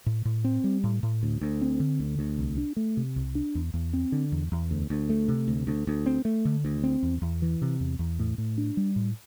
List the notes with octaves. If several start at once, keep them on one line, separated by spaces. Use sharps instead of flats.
A2
A2
C4
G3
A2
A2
D2
D2
C4
D3
D2
D2
C2
D4
A3
C3
C2
D4
E2
E2
C4
D3
E2
E2
D2
D2
A3
C3
D2
D2
D2
C4
A3
D3
D2
C4
E2
E2
E3
C3
E2
E2
A2
A2
D4
G3
A2